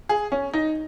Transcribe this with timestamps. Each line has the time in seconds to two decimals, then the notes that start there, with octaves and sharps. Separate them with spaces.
0.09 G#4
0.32 C#4
0.53 D#4